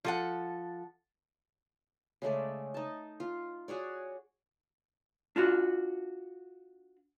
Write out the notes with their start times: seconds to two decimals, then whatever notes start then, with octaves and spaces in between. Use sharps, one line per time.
0.05 F3 A4 F#5
2.22 C#3 G#3 A3 D5
2.74 D#4 A5
3.20 F4
3.68 F#4 G#4 C#5 D5
5.36 D4 F4 F#4